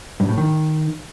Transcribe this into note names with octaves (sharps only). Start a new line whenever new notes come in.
G2
A2
D#3